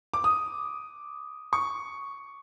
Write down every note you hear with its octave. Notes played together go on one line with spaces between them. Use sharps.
D6
D#6
C#6